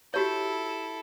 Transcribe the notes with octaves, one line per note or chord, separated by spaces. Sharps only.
E4 F#4 G4 A4 C#5